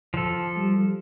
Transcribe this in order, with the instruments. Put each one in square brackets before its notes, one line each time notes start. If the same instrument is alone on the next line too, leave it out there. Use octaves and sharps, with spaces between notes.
[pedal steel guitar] F3 A4
[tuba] G3